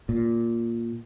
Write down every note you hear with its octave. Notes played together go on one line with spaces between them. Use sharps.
A#2